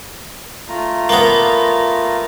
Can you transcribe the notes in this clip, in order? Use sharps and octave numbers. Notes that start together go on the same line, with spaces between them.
A3 F4 A#5
A#3 B3